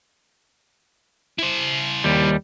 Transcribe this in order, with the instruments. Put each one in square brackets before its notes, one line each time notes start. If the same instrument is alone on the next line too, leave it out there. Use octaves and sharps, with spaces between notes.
[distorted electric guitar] E4 C5
[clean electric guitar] D#2 G3